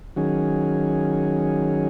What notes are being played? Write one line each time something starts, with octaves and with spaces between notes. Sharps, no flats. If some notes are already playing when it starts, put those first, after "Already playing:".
D#3 F#3 C#4 G#4